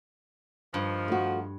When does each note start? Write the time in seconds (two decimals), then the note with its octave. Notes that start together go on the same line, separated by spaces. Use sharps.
0.74 G2 D#3 F3
1.08 A3 F#4